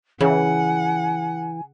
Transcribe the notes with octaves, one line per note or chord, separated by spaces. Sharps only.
C#3 E3 F#5 G#5